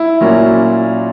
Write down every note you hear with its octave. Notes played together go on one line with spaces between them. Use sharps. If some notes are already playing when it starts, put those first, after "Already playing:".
Already playing: E4
A#2 F#3 A#3 C#4